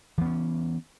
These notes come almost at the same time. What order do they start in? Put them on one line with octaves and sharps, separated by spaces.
E3 B3 C#4